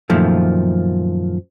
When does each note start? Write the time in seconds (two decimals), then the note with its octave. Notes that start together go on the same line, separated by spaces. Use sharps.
0.10 F#2 A#2 D#3 F3 A3